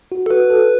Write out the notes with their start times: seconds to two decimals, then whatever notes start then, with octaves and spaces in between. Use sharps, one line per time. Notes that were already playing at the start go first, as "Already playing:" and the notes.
0.12 F#4
0.26 A4
0.31 F#4 B4
0.50 A4